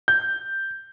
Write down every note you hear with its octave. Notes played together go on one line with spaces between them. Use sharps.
G6